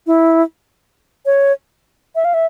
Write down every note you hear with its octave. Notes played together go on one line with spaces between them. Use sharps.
E4
C#5
E5
F5
E5